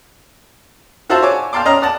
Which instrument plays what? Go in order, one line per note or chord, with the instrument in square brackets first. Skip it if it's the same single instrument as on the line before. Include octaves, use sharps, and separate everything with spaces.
[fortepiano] F4 F#4 C5 E5 A5 C6
C#5 G#5 D6
F5 G5 A5 C6 D6
C#4 D#5 A#5 C6 F6
D5 F#5 A5